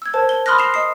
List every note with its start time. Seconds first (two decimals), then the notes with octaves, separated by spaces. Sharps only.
0.02 E6 G#6
0.14 A#4 C5 A5
0.29 G7
0.46 B5 C6 D#6 F6 F#6 A#6
0.58 C7 E7 F7
0.74 D#5 D#6 C7